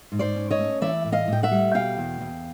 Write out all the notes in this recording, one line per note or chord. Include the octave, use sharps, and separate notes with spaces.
G#2
C5 D5
C#4
C#5 D#5
A3
E3 D5 E5
A2
D#5 F5
A2 G5
E5 F#5
G3
B2 F5 G5
E2
E2